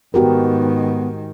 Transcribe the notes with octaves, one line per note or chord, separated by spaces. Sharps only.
G#2 D#3 B3 F#4 G4 A#4